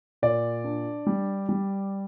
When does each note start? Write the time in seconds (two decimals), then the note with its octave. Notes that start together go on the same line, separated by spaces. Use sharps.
0.22 A#2 D5
0.64 D4
1.07 G3
1.49 G3